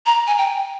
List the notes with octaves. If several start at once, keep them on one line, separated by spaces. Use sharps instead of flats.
A#5
G#5
G5